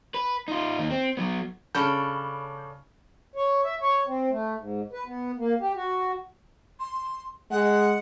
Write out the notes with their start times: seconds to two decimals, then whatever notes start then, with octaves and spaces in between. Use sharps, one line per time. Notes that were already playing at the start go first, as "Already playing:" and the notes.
0.14 B4
0.48 D#4 F4
0.79 D#2 D#4
0.90 C4
1.17 F#3 B3
1.75 C#3 C#4 D4 A4 B5 G6
3.35 C#5
3.64 E5
3.81 C#5
4.07 C4
4.30 A3
4.58 G#2
4.93 B4
5.06 B3
5.38 A#3
5.61 G4
5.76 F#4
6.80 C6
7.51 G#3 F#5